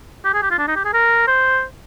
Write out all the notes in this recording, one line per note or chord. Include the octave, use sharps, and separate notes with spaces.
G4
G#4
G4
F4
D4
D#4
G4
G#4
A#4
C5